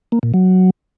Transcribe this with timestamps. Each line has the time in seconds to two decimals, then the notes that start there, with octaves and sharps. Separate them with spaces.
0.12 A#3
0.23 A#2
0.34 F#3